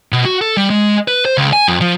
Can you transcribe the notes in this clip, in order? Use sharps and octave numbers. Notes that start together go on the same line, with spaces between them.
B2
F#4
A4
G3
G#3
B4
C5
C#2
G#5
F2
F3